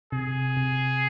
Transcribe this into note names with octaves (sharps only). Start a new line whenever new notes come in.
C3 G#4
C3